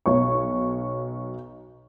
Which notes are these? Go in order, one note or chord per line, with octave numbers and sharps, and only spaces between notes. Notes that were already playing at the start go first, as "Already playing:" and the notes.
B1 C#5 C#6